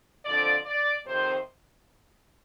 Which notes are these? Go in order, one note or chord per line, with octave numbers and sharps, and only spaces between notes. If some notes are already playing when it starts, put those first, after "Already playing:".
F2 D3 F3 D5
D5
F2 C3 D#3 C5